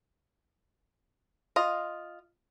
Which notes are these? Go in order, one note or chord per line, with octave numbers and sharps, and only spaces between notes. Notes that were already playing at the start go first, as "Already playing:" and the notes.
F4 D#5